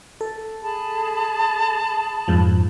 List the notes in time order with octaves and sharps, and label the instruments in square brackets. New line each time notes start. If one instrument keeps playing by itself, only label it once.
[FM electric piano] A4
[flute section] G#4 A5 B5
[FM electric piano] F2 G#2 F3